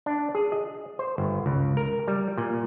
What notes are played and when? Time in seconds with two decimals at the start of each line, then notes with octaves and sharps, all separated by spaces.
0.06 D4
0.35 G#4
0.52 D#5
0.99 C5
1.18 G1
1.46 C#2
1.77 A#4
2.08 G3
2.38 A#2